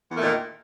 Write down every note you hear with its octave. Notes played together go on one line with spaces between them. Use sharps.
E2 A#2 D#3 A3 A#3